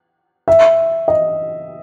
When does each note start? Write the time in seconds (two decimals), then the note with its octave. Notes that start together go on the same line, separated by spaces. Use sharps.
0.48 E5
1.08 D#5